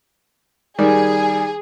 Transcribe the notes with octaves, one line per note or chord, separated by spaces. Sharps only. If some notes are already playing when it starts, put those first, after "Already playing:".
D#3 G3 G#4